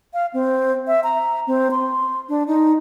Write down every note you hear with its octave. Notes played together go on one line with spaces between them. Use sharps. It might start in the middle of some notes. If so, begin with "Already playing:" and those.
F5
C4
E5
A#5
C4
C6
D4
D#4